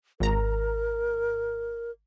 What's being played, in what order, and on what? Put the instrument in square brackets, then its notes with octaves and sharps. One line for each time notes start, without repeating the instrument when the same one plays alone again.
[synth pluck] G#1 A#5 [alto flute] A#4